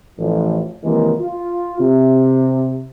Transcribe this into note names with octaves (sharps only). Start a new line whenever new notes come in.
A1 F3
C3 D#3 E3 F#3 G#3 A#3
F4
C3